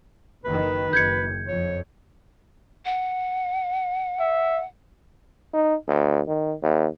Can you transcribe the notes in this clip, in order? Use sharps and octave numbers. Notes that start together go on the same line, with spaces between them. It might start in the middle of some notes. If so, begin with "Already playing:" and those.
F#1 D#3 B4
F#1 G6 G#6 C#7
F2 C#5
F#5
E5
D#4
D2
D#3
D#2